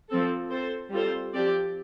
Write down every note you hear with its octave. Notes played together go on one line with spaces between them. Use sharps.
F3 C4 A4
C4 A4 C5
G3 C4 F4 A4 C5
F3 C4 G4 D5